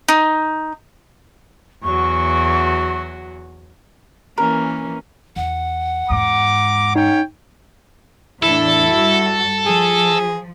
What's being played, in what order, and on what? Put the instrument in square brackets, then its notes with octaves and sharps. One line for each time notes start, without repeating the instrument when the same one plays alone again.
[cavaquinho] D#4
[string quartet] E2 F#3 F#4 [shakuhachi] C#6
[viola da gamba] E3 A#3 C#4 [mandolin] A#4
[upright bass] E2 [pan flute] F#5
[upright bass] E2 G#2 [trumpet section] A#5 D6
[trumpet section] C#4 C#5 G5 [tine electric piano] D#4
[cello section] E2 A2 D4 [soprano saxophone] E4 [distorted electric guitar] A4
[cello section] G2 G3 F#4
[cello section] F3 [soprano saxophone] G#4